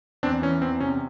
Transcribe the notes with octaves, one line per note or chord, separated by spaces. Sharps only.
E2 C4 D4
E3 C#4
E2 C4
C3 C#4